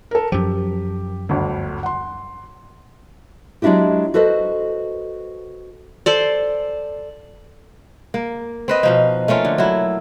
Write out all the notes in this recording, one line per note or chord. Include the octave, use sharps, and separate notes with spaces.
A4 A#4
F#2 F3 G4
G1 D2
F#5 C6
F#3 G#3 D4 E4 F#4 G4
F#4 A4 B4 C5 D#5
A4 C5 D5
A#3
C4 B4 D#5
B2 F3 D#4
A3 A#3 C#4 F4
D3
F#3 E4